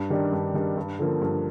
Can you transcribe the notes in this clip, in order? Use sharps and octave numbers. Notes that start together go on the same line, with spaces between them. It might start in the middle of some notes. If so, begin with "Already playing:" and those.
Already playing: G2
D#3 G3 D4
G2
D#3 G3 D4
G2
D3 F3 A#3
G2